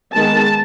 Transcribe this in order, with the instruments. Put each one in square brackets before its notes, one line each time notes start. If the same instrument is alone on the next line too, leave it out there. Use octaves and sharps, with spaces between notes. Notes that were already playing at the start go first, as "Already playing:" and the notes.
[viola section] D#3 G#3 B3 A5